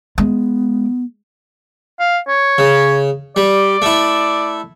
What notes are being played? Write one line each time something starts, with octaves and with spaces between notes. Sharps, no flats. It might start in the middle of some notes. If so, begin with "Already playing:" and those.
G#3 B3
F5
C#5
C#3
G3 D5
A3 E4